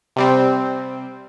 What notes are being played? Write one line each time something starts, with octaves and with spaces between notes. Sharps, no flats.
C3 G3 C4